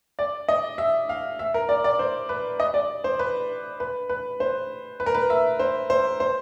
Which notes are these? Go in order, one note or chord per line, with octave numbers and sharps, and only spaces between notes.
D5
D#5
E5
F5
E5
A#4
D5
D5
C5
B4
D#5
D5
C5
B4
B4
B4
C5
B4
A#4
B4
E5
C5
C5
C5